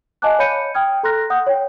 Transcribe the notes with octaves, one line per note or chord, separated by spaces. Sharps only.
D#5 F5 G#5 A5 D6 F#6
C#5 F5 B5 G6 C#7 D#7
G5 D#6 F6 G#6
A4 A#5 C6 F6 F#6 A#6
F#5 D#6 G6
C#5 G5